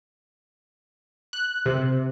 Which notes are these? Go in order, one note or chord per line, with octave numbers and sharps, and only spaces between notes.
F#6
C3